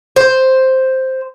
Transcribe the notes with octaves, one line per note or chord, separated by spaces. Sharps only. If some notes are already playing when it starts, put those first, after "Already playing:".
C5